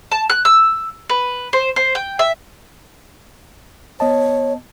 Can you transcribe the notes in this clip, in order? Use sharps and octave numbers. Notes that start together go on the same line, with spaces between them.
A5
F#6
E6
B4
C5
C5
G5
E5
B3 C#5 D#5 A5